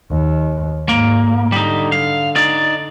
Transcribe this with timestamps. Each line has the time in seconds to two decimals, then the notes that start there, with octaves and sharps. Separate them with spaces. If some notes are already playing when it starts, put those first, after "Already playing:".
0.10 D#2
0.89 G#2 A#3
1.52 D3 G3 D#4
1.92 F5
2.36 D#4 D5